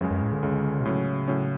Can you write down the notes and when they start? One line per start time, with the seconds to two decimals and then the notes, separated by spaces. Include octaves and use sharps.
0.01 C#2 F#2 C#3 G#3
0.11 F#2
0.22 A2
0.33 D3
0.43 C#2 C#3 G#3
0.80 B2
0.85 A2 C#3 F#3 C#4
1.28 A2 F#3 C#4